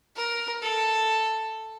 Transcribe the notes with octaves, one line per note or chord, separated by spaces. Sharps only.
A#4
A4